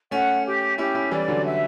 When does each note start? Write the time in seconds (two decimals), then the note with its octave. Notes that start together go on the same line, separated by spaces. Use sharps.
0.11 A3 C#4 F#5
0.45 G4
0.78 C#4 E4 G4
0.95 C#4 E4
1.11 E3 G3 D5
1.28 D3 F#3
1.45 E5